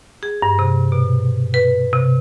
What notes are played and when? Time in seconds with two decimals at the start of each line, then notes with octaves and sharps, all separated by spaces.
0.23 G#4
0.42 G2
0.59 C3
0.92 B2
1.54 B4
1.93 C3